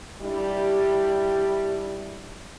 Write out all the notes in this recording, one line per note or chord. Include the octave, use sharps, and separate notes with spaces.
G3 D4 E4 G4